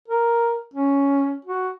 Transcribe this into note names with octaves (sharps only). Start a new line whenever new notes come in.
A#4
C#4
F#4